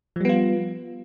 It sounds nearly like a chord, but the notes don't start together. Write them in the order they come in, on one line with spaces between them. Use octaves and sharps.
F3 G3 B3 F4